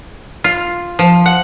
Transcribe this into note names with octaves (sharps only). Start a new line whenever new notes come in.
F4
F3
F#5